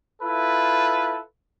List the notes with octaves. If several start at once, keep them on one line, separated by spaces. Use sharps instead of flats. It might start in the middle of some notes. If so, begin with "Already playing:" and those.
E4 F4 A4 B4